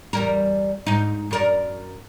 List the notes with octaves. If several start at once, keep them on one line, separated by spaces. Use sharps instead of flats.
E2 G3 A#4
G#2 D#4
F#2 A#4 D5